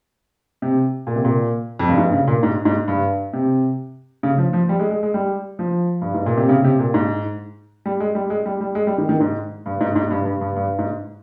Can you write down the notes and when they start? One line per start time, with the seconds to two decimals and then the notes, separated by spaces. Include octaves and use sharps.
0.62 C3
1.07 A#2
1.16 C3
1.25 A#2
1.79 F2
1.89 G2
1.98 G#2
2.12 C#3
2.27 A#2
2.43 G#2
2.65 G#2
2.88 G2
3.33 C3
4.23 C#3
4.38 F3
4.53 F3
4.69 G3
4.79 G#3
4.91 G#3
5.03 G#3
5.14 G3
5.59 F3
6.02 G2
6.14 G#2
6.26 A#2
6.37 C3
6.49 C#3
6.64 C3
6.79 A#2
6.94 G#2
7.86 G3
8.00 G#3
8.15 G3
8.30 G#3
8.46 G3
8.61 G3
8.75 G#3
8.87 G3
8.98 D#3
9.09 D#3
9.20 G#2
9.66 G2
9.81 G#2
9.96 G#2
10.11 G2
10.26 G2
10.41 G2
10.56 G2
10.79 G#2